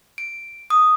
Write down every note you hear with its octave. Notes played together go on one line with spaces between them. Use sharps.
D7
D#6